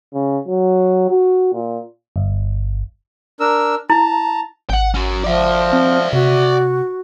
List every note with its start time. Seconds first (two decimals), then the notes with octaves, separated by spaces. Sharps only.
0.14 C#3
0.48 F#3
1.10 F#4
1.54 A#2
2.16 G1
3.40 D4 A#4 E6
3.90 E4 A5 A#5
4.70 G#1 F#5 G5
4.94 C#4 F#4
5.24 F3 D5 E5
5.73 C4
6.13 C3 F#4